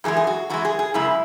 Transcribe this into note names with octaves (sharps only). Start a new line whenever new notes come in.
F#2 E3 G#3 G#4
G#4
F#4
F#2 E3 G#3 F#4
G#4
G#4
F#2 C#3 G#3 E4